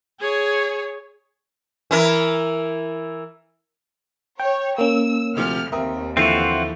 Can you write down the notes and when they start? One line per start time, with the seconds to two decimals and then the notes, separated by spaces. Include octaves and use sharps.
0.20 G#4 C#5
1.91 E3 E4 A#4
4.40 C#5 G5
4.78 A#3 C#4 E6
5.37 D2 C3 F3 F6
5.72 D#2 C4 A#4 E5 D#6
6.17 D3 E3 F3 C4 F4 F#4 E5